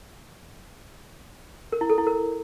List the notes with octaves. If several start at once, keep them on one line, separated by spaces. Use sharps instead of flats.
A#4
E4
A4
E4
A#4